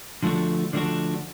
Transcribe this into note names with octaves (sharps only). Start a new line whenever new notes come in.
D3 F3 A3 D4 F#4
D3 F3 A3 D4 F#4